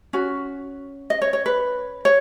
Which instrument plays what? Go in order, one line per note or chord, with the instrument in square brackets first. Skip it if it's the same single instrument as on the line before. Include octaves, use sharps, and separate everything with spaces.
[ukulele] C#4 F#4
D#5
C#5
C#5
B4
C#5